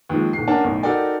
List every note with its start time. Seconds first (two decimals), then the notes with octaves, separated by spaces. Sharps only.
0.09 D#2 F3 G#3
0.33 D#1 C7
0.48 C#4 D4 A#4 F#5 G#5 A5
0.64 B1 A2
0.83 D#4 F#4 A4 A#4 D5 G5